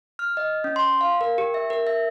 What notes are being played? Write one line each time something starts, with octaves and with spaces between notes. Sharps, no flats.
F6
D#5
C#4
C6
F5
A#4
G4
E5
A#4
E5